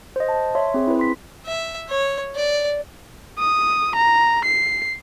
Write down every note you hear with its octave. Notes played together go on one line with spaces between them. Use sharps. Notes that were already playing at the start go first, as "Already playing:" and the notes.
C5 D#5
A5
C#5 E5 C6
C4 G#4
E4 B4
C6 B6
E5
C#5
D5
D#6
A#5
C7